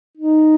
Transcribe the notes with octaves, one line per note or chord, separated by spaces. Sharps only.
D#4